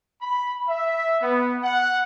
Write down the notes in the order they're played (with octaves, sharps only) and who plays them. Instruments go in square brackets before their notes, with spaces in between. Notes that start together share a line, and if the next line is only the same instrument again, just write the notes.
[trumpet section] B5
E5
B3
F#5